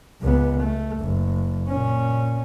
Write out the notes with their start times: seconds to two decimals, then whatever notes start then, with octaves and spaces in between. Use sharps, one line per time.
0.21 C#2 B3
0.60 A3
1.00 F#1
1.68 A#2 C#4